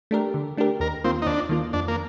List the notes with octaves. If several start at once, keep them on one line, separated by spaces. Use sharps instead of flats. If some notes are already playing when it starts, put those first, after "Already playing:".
A3 D4 G4 A#4
D3
A3 D4 G4 A#4
D#2 A#4
D#3 A#3 C4 F4
D#4
D#2 D4
D#3 A#3 F4
F2 D4
A#3